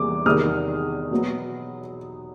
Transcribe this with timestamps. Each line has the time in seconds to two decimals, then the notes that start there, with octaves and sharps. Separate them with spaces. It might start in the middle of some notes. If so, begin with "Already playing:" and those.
Already playing: E2 C3 E3 G3 A#3 D6
0.26 E2 C3 D#3 D#6 F6
1.11 B2 F#3 B3